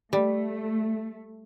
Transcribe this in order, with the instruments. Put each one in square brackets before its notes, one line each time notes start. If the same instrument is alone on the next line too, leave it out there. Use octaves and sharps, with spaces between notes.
[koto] G3 [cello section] A3